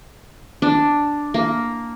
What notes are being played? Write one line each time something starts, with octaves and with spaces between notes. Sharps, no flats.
D4
A#3